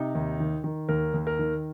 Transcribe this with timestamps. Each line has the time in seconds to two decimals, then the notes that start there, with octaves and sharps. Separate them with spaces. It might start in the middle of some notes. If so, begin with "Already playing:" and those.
Already playing: C3 D#4
0.15 D#2
0.40 D#3
0.64 D#3
0.89 D#2 A#4
1.14 D#2
1.27 A#4
1.39 D#3